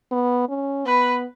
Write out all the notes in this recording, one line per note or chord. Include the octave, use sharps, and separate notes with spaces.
B3
C#4
B3 B4